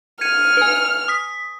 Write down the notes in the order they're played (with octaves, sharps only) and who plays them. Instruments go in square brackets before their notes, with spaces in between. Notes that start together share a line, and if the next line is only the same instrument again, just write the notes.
[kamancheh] F6 [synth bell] G#6 C#7 D#7
[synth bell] B4 G#5
D#6 B6